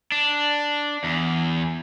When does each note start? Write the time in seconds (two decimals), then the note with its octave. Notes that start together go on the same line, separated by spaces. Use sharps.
0.12 D4
1.04 E2